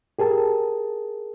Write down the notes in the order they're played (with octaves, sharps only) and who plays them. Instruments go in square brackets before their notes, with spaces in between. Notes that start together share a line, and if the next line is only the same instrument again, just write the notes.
[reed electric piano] G4 G#4 A#4 A5